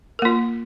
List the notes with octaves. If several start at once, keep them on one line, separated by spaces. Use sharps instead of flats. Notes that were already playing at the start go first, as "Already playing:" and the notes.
A#3 F4 A#4